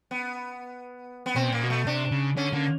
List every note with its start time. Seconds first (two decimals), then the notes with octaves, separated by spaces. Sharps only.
0.11 B3
1.26 B3
1.36 B2 C4
1.50 A#2 A#3
1.63 B2
1.70 A3
1.86 C3 D4
2.11 C#3
2.36 D3 C#4
2.53 D3 A#3